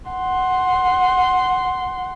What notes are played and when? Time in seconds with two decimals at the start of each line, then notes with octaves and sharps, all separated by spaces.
0.10 F#5 C6